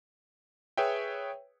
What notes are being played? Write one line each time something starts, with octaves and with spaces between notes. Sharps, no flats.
G#4 B4 C#5 E5 G5